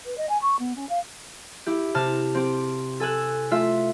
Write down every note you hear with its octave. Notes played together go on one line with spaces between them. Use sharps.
B4
D#5
G#5
C#6
B3
C#4
F5
E4 G4
C3 A5 F6
C4 G4
A4 G#5 E6 F#6
A3 F4 E5